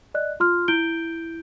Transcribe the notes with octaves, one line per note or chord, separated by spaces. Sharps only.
D5 D#5 F#6
F4 C6 F6
E4 G6 D7 G7